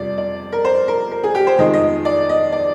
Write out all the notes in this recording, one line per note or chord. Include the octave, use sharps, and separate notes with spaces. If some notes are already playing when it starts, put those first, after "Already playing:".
Already playing: F2 C3 G3 D5
D5
A#4
C5
A#4
A#4
G#4
G4
C5
F2 D#3 G#3 D#5
D#5
D5
D#5
D5